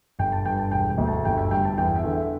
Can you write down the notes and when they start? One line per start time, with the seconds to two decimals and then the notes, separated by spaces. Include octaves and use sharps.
0.19 G1 G5
0.32 A5
0.45 G2 G5
0.59 A5
0.71 E1 G5
0.90 G5
0.98 D2
1.08 A5
1.25 G1 G5
1.38 E5
1.51 G2 G5
1.65 A5
1.77 E2 G5
1.96 E5
2.04 D3
2.13 E5